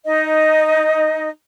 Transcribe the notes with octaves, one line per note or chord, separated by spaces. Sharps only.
D#4 D#5